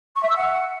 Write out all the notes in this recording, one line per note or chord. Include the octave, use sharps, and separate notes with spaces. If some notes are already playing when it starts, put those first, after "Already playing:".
C#6
E5
E6
F#5